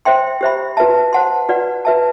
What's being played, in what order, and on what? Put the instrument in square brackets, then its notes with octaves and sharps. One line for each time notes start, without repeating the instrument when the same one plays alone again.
[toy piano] C5 E5 G5 C6
G4 C5 E5 B5
F#4 B4 E5 A5
C5 F#5 A5 C6
F#4 B4 D5 F#5
F#4 B4 E5 A5